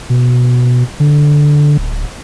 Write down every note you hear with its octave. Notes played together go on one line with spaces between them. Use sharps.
B2
D3
D1